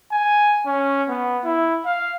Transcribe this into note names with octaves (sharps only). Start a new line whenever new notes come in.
G#5
C#4
B3
E4
F5